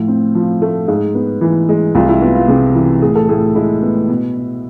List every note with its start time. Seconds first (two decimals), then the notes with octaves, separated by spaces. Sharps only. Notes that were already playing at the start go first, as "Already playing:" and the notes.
Already playing: A2 F3
0.08 C4
0.35 F3
0.62 A3
0.88 G#2 G#4
1.15 B3
1.41 E3
1.69 G#3
1.95 C2 F4
2.08 E4
2.22 B3 F4
2.35 F4
2.48 C3 G#4
2.75 E3
3.02 A2 G#4
3.15 A4
3.29 A2 G#4
3.55 G#3 E4
3.82 B3
4.09 B2
4.35 B2